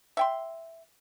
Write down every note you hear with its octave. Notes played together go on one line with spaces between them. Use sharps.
E5 G5 C6